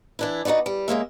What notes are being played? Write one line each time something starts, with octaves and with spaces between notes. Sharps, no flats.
E3 D4 E4
D#4 F4 F#4 B4 D5
G3
C#3 G#3 A#3 E5